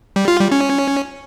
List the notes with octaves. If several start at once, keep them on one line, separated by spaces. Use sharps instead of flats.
G3
F4
G3
C#4